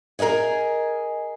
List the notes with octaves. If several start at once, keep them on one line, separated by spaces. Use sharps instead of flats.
G#4 A#4 D5 D#5 G#5